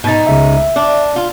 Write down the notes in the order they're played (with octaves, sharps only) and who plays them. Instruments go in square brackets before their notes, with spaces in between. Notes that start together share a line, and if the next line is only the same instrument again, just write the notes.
[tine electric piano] G#2 A6 [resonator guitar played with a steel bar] B2 D#4
[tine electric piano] C#2 C#3 E5
E5
[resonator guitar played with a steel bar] D4
F4